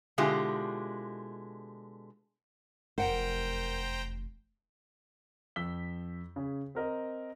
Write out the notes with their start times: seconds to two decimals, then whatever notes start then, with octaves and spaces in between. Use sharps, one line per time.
0.18 B2 D3 G#3 E4 F4 G4
2.98 F1 E2 A#4 C5 F#5 G5 A#5
5.56 F2 E6 B6 G7
6.36 C#3 G#4
6.75 C4 A#4 D#5